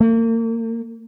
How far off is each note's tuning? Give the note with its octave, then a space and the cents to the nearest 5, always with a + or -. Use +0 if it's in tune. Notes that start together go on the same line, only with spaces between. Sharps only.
A#3 -35